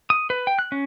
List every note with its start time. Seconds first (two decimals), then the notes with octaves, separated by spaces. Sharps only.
0.10 D#6
0.30 B4
0.47 G5
0.59 F#6
0.72 C#4